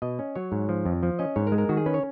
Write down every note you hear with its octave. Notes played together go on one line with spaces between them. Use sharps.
B2 D#5
C#4
F#3 C#5
G#2
F3
F2
F3
C#4 D#5
G#2 C#5
A#4
G#3
A#4
D#3 F#4
G#4
C#4 B4
C#5